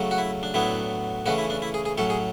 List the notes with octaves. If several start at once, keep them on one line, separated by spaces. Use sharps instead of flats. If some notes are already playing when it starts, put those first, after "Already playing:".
Already playing: C#3 F#3 A3 C#4
F#4
E4
D4
A2 F#3 B3 D4 E4
C#3 E3 A3 C#4 F#4
E4
D4
E4
G#4
G#4
A2 F#3 C#4 A4
G#4